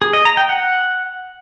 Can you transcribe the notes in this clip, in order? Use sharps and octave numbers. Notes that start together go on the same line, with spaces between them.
G#4
D#5
A#5
G5
F#5